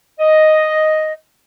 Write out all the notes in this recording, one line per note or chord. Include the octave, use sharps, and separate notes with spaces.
D#5